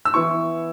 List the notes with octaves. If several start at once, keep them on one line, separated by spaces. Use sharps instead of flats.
E6
E3 B3 E4 C#6